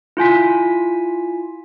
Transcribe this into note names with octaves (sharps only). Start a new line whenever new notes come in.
E4 F4 G#5 B6